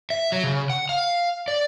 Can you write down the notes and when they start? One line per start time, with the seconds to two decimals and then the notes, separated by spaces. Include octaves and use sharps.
0.10 E5
0.32 F#3
0.43 C#3
0.70 F#5
0.89 F5
1.48 D5